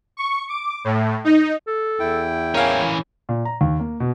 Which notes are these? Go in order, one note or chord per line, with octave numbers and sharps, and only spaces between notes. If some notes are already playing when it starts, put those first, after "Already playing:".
C#6
D6
A2
D#4
A4
E2 E4 G5
E3 C#4 A#4 C#5 F5
A#2
A#5
D#2
A#3
B2